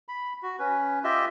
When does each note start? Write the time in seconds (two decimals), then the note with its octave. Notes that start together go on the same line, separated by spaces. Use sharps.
0.08 B5
0.43 F#4
0.59 C#4 B4
1.04 F4 G4 D#5 E5